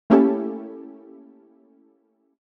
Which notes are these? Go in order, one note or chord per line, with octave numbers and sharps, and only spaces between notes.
A3 A#3 C#4 E4 G4 A4